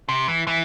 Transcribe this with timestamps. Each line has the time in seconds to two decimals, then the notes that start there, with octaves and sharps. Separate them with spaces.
0.09 C3
0.28 E3
0.47 E3